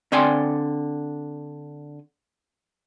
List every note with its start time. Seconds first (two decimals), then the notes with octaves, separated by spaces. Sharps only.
0.12 D3 C4 D5 G5 G#5 C6